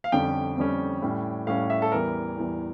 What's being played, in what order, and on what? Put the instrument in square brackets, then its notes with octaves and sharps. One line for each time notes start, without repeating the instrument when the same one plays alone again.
[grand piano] F5
F2 D3 G3 C#4 G5
F2 D3 G3 C#4
A2 G3 C#4
A2 G3 C#4 F5
E5
A4
E2 E3 G3 A#4
E2 E3 G3